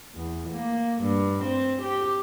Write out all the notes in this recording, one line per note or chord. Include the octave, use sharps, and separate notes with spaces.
E2
A#3
G2
C4
G4